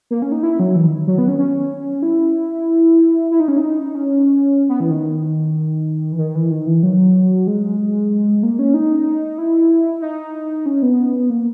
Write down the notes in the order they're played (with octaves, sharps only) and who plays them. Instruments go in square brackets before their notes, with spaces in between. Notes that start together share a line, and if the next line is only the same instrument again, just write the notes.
[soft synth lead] A#3
C#4
D#4
E4
F#3
E3
D#3
F#3
B3
C#4
C#4
E4
E4
D#4
C#4
D#4
C#4
B3
E3
D#3
E3
D#3
E3
D#3
E3
F#3
G#3
A#3
C#4
D#4
E4
D#4
C#4
B3
A#3